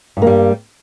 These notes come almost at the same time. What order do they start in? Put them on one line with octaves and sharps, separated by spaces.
G2 A#3 G3